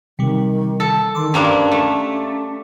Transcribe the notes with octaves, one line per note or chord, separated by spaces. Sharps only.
C3 D#3 G3
A4
D#3 C6 D6
G2 A#3 C#4 D4
A3